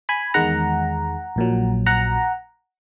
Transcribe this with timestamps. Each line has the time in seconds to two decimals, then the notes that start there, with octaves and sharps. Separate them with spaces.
0.09 G#5 B5
0.34 E2 D#3 G#3 F#5 A#5
1.36 A#1 A#2 F#3
1.86 F#5 A#5